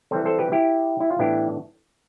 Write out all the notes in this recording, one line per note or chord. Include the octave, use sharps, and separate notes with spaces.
E3 G3 C4 A4 C5
A4 C5
G4 B4
E4 G4
E4
F4
A2 E3 B3 D4 E4 G4